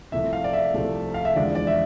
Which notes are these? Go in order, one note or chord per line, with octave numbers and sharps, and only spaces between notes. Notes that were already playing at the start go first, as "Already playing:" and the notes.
C2 C3 F3 A3 E5
F5
D5
E5
C2 C3 F3 A3
F5
E5
E2 D3 F3 G#3 D5
D5
E5